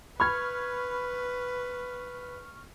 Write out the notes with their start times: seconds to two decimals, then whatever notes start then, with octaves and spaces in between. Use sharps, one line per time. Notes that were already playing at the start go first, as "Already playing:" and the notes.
0.20 B4 B5 C#6 F6 G#6